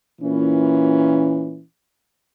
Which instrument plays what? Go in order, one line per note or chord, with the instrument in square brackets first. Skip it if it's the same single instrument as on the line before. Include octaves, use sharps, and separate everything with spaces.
[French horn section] A#2 E3 C#4